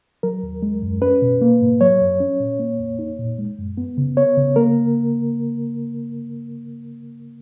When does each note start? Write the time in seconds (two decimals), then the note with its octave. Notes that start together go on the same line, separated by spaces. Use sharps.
0.23 F#3 A#4
0.43 D#2
0.62 G#3
0.82 F#2
1.02 C#4 B4
1.22 B2
1.41 A#3
1.61 G#2
1.81 F#3 C#5
2.00 F#2
2.20 C#4
2.40 A#2
2.59 A#3
2.79 F2
2.99 D#4
3.19 A#2
3.39 G#3
3.58 F#2
3.78 B3
3.97 C#3
4.17 B3 C#5
4.37 C#3
4.56 A#3 A#4